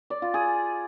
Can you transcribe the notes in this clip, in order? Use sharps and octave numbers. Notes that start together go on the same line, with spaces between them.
D5
F4
G#4